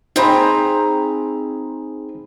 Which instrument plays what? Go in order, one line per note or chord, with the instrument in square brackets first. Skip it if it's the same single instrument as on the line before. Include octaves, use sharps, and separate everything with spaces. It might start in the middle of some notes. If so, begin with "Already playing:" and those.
[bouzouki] C4 G#4 A#5 [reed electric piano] D#4 C5 B5